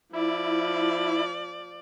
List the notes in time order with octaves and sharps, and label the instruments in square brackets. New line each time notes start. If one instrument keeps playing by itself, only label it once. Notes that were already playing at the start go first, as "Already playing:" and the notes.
[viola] F3 D5 [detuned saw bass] E4